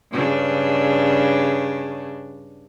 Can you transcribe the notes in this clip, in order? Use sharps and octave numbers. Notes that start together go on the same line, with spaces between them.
G2 C#3 D4